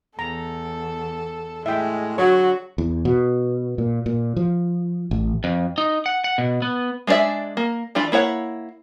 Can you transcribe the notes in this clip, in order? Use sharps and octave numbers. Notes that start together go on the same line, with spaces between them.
E2 A4 A#5
A2 G#3 E5 G5
D3 F#3 F#4 C#5
E2
B2
A#2
A#2
F3
A1
F2
D#4
F#5
F#5
B2
B3
G#3 D4 C5 D5 E5
A#3
E3 D4 F4 B5
A#3 E4 C#5 F#5